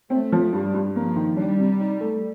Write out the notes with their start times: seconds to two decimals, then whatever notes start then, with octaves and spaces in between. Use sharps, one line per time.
0.10 A3 C4
0.32 F3
0.53 G2 G3
0.74 G2
0.95 F3 A#3
1.16 D#3
1.37 G3 D4
1.59 C3
1.80 D#4
2.00 A3